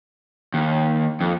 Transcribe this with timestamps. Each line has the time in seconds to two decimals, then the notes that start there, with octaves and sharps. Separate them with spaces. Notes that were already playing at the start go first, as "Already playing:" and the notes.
0.54 D#2
1.21 F2